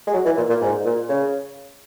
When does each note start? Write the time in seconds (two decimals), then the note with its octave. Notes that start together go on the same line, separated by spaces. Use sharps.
0.07 G#3
0.13 F#3
0.25 E3
0.37 A#2
0.49 A#2
0.61 G#2
0.85 A#2
1.09 C#3